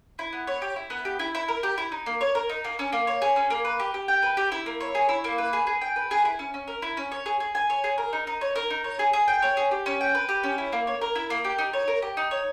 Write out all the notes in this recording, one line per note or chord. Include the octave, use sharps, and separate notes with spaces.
E4
B3
C#5
G4
E4
B3
G4
E4
E4
A#4
G4
E4
D#4
A#3
C#5
A#4
D#4
A#3
C#4
A#3
C#5
G#4
C#4
A#3
B4
G4
G4
G5
B4
G4
E4
A#3
C#5
G#4
E4
A#3
B4
G#4
G#4
G5
B4
G#4
E4
C#4
C#4
A#4
E4
C#4
C#5
G#4
G#4
G#5
C#5
G#4
A#4
D#4
D#4
C#5
A#4
D#4
C#5
G#4
G#4
G5
C#5
G#4
G4
C#4
G5
B4
G4
C#4
E4
A#3
C#5
A#4
E4
A#3
G4
D#4
C#5
A#4
G4
D#4
C#5